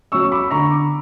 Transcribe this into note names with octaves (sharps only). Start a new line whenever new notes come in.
F#3 C#4 C#6 E6
B5 D6
D3 A#5 C#6
B5 D6